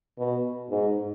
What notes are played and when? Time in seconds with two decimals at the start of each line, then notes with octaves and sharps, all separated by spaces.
0.18 B2
0.70 G#2